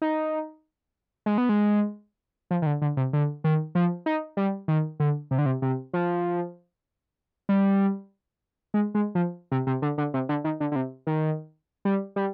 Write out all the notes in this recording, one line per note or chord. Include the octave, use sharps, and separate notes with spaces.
D#4
G#3
B3
G#3
F3
D#3
D3
D3
C3
D3
D#3
F3
D#4
G3
D#3
D3
C3
D3
C3
C3
F3
G3
G#3
G#3
F3
C3
C3
D3
D3
C3
D3
D#3
D3
D3
C3
D#3
G3
G3